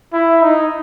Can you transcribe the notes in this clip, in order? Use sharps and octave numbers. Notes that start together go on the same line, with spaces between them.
E4
D#4